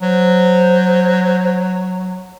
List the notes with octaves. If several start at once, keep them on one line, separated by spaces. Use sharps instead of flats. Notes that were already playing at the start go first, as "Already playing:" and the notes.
F#3 C5